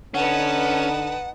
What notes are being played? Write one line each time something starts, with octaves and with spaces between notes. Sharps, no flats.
D3 C#4 D#4 B4 F#5 A5